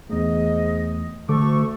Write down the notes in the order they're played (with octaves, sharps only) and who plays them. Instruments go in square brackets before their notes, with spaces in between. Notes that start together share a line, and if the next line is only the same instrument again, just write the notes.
[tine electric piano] E2 A3 [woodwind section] G#2 D#5
[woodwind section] D2 A4 C#6 [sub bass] D3 [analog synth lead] A3 [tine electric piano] D6